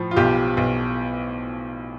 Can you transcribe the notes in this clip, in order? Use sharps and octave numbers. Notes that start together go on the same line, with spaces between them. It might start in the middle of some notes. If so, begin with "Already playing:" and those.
Already playing: A2 F3
F4
B1 G4
B1